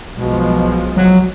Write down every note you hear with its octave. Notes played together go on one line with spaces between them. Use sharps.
B1 B2 F3 G#3
F#3